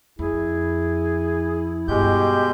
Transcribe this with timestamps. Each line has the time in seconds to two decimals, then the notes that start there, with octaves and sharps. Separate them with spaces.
0.19 F2 E4 G#4
1.88 G2 B2 G#3 G4 G6